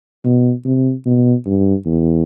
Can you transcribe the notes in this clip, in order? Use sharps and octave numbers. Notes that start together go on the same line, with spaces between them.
B2
C3
B2
G2
E2